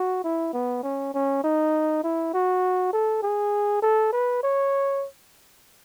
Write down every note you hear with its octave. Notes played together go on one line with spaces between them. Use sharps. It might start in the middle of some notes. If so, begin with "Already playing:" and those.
Already playing: F#4
E4
B3
C#4
C#4
D#4
E4
F#4
A4
G#4
A4
B4
C#5